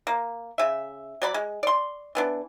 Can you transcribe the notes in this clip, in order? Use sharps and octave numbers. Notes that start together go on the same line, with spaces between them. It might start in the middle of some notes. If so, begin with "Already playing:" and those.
A#3
C#3 E5
F#3 D5 B5
G#3
D5 C6
E3 B3 D4